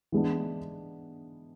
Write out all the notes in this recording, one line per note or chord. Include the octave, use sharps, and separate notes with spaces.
E3 G#3 B3 D4